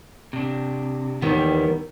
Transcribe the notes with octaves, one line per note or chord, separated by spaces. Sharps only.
C3 D4
D#2 D#3 E3 G3 B3